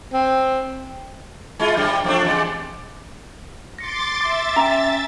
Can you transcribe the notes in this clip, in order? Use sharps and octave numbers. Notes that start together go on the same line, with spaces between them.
C4
G#3 E4 F4
F#2 G3
F3 A3 D4
E2 G#3 D5
C6 D6 A6 A#6 C#7
E5 D6 A6
C#4 G5 G#5 A#5